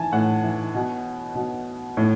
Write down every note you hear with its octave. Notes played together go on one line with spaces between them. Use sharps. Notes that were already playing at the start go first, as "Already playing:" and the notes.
Already playing: E3 G#5 A5
A2 F#5
E3
B2
B2
A2